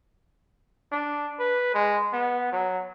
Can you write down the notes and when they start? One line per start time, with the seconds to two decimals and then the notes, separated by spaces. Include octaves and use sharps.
0.92 D4
1.39 B4
1.74 G#3
2.13 B3
2.52 F#3